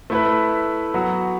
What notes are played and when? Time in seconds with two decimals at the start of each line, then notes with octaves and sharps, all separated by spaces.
0.10 A3 E4 B4
0.94 F#3 B3 F#4